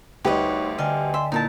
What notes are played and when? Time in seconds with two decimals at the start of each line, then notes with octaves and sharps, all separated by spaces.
0.25 D2 G3 D#4 G4 B4 C#5 D#5 C#6
0.79 D3 D#5 F5 G5 G#5
1.14 E5 C6
1.32 A#2 D#4 E4 A#4 A5